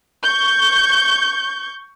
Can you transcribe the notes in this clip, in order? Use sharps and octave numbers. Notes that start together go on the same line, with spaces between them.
C#6 G6